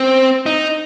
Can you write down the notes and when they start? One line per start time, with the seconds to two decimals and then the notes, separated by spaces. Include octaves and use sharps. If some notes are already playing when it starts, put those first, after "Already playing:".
Already playing: C4
0.46 D#4